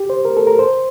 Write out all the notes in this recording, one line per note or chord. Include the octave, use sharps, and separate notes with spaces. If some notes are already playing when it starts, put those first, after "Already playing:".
Already playing: G4
C5
A#4
A4
A#4
C5